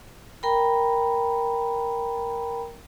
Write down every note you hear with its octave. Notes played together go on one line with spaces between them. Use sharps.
A#4 G5 A#5 B5